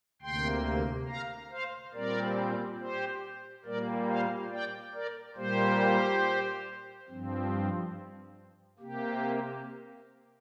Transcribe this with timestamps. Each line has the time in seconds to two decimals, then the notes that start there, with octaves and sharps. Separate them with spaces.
0.22 D2 C3 A#3 G5 C6
1.08 F5 A#5
1.50 C5 F5
1.93 A#2 G3 C4 A#4 D5
2.79 G4 C5
3.65 A#2 G3 A#3 A#4 D5
4.08 C5 F5
4.52 D5 G5
4.94 A#4 D5
5.36 A#2 G3 A#3 G4 C5
7.09 G2 F3 C4
8.79 C3 A#3 G4